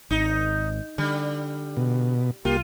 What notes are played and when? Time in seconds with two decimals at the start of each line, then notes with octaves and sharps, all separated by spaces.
0.10 G#1 D#4
0.98 D3 G3
1.77 B2
2.45 C2 A#3 F4 G4